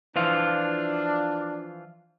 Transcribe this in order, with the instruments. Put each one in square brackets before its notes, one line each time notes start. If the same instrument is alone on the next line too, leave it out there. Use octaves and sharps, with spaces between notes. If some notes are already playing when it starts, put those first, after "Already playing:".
[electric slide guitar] E3 F3 F4 [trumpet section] D4